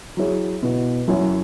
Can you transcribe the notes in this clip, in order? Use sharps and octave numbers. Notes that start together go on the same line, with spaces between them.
F#3 E4 G#4 C#5
B2 B3 E4
F#2 F#3 E4 C#5